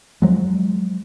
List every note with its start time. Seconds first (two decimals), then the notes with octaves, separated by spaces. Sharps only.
0.22 F3 F#3 G#3